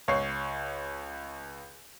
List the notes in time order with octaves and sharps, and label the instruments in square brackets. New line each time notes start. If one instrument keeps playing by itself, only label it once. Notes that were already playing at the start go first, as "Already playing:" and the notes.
[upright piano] C#2 C#5 C#6 C7